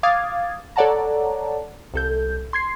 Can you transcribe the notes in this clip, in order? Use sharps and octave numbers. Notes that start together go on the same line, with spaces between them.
F5 D6 D#6 G#6 A6
A4 C#5 D5 F#5 A5 A#5
C2 A4 G6
C6 G#6 C7